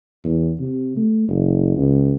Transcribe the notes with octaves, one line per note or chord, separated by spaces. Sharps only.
E2
C3
A3
F#1
C#2